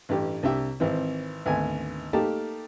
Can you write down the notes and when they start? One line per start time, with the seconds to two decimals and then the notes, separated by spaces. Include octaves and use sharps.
0.09 A1 G2 G4
0.43 C2 D4 G4 E5
0.80 G#1 E3 C4
1.46 G#1 D2 B3 G#5
2.13 A3 A#3 D#4 G4 A#4 A5